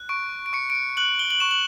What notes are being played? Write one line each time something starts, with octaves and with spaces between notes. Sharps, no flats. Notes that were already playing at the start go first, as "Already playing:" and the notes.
Already playing: F#6
C#6 D7
D7
C#6 C#7
D7
C#7
F#6 F#7
G7
F#7
C#6 E7
F#7